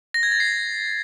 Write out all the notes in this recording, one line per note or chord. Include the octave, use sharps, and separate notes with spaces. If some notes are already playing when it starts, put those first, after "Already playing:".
A#6
G#6
A6
C7